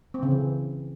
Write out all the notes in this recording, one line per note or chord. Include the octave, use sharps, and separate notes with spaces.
C4
C#3
E3